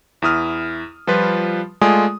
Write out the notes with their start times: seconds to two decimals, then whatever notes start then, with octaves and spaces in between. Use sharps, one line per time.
0.22 E2 E4 D#6 F6
1.07 F3 G3 F4 B4
1.81 G#3 A3 F4 D5 G#5 D#6